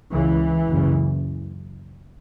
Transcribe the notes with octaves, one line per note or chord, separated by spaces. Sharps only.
C#2 C#3 E3
F#1 F#2 C#3